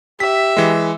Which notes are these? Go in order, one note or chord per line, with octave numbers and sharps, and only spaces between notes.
G4 E5 B6
E3 G#3